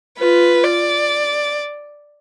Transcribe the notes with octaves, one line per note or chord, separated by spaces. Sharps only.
F4 B4
D5